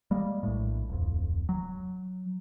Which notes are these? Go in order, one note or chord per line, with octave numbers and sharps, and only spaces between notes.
G3 G#3 A#3
A#1 A2
D1 F2
F#3